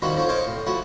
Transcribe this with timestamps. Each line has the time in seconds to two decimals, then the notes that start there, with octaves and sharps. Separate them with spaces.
0.02 D#3 F3 G3 C4 E4 F#4
0.15 D3 F3 C4 C#5
0.29 C5 C#5 D#5 F5 G5 G#5
0.46 A2
0.66 F3 A3 E4 F#4